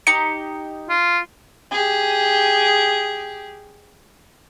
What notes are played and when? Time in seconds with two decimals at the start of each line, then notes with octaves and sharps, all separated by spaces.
0.07 D#4 G4 C#7
0.89 F4
1.72 G4 G#4